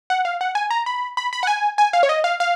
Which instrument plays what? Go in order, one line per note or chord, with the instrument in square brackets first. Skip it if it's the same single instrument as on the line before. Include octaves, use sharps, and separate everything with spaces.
[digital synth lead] F#5
F5
F#5
G#5
A#5
B5
B5
B5
F#5
G#5
G#5
F5
C#5
D#5
F5
F5